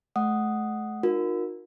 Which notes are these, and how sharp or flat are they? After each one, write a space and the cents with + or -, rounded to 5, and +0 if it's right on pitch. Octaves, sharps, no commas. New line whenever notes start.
A3 -35 F#5 +0 D#6 +0
D#4 +0 F#4 -45 A#4 +10